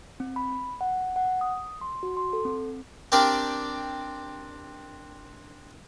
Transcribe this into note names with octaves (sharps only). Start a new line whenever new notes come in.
C4
B5
F#5
F#5
D#6
C6
F#4
C6
A4
C4
C4 D4 G4 A#4 D5